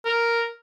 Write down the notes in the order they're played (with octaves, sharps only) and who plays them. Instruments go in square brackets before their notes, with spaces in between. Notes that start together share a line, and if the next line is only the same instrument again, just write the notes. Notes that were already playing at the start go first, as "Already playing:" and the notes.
[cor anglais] A#4